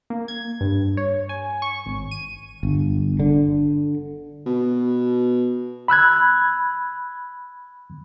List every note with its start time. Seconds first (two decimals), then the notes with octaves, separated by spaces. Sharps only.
0.10 A#3
0.28 G#6
0.61 G2
0.97 C#5
1.29 G#5
1.62 C#6
1.86 G#1
2.11 D#7
2.63 G1
3.19 D3
4.46 B2
5.88 B5 E6 F#6 G#6